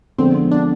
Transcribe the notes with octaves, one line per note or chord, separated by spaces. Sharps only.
D3 F3 G#3 B3 C4
D4